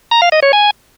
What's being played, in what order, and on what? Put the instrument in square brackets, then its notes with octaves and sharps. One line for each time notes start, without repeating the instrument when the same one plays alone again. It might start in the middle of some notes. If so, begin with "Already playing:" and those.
[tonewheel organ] A#5
F5
D#5
C#5
G#5